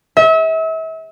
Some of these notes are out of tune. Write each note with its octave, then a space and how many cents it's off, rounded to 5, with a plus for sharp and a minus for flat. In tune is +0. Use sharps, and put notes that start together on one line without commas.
E5 -35